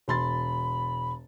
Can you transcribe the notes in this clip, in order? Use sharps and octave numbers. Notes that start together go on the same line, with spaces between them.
E1 B5 C6 A6